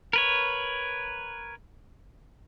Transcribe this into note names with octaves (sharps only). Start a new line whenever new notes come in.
A#4 B4 C#5